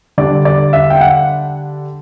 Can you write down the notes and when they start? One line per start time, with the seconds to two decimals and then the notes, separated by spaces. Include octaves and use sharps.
0.18 D3 G3 D4 D5
0.45 D5
0.73 E5
0.90 G5
1.01 F#5